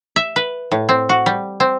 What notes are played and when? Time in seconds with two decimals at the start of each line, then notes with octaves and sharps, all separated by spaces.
0.16 E5
0.36 B4
0.71 A2
0.89 C4
1.09 F#4
1.26 G3
1.60 C4